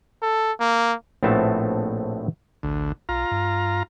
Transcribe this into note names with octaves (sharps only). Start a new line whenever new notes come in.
A4
A#3
A#1 A2 A3 B3 C4 A5
A1 D2
B1 F4 A#5
G2